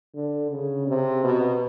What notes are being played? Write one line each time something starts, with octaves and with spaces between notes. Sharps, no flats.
D3
C#3
C3
B2